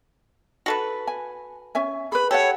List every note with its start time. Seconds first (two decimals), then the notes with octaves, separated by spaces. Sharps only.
0.66 F#4 A4 B4
1.07 G#5
1.75 C#4 E5 G#5
2.12 G#4 B4 B5
2.31 G4 A4 C#5 F#5